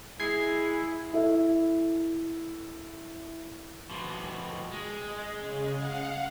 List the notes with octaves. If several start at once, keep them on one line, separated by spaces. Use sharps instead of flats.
G#3 E4 G#6 C7
E4 A4 E5
B2 F3
G#3
C#3
F5 F#5